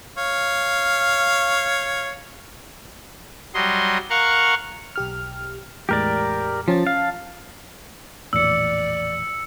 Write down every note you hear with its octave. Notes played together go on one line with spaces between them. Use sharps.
C#5 F5
F#3 G3 D#5 C6
A#4 F5 F#5 C#6
B1 G4 F6
E2 A2 G#3 G4 A#4 D5
F3 C#4 A5 A6
F5
A#1 E2 A2 D5 E6 C#7